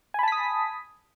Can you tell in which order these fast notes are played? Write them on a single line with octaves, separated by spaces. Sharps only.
G#5 B5 A5 B6 D#6